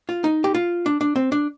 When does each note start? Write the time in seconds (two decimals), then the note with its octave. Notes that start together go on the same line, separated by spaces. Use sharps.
0.09 F4
0.24 D#4
0.44 G4
0.55 F4
0.86 D4
1.01 D4
1.16 C4
1.32 D4